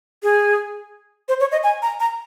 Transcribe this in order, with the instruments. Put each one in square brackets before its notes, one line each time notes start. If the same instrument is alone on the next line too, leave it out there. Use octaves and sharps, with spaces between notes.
[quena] G#4
C5
C#5
D#5
G#5
A#5
A#5